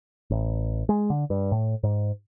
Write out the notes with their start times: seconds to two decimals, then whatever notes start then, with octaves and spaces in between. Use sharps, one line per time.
0.30 A1
0.89 G#3
1.10 D3
1.30 G2
1.52 A2
1.83 G#2